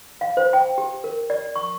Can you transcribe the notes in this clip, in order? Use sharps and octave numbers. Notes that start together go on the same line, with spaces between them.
F5
C5
G5
G4
A#4
D5
C#6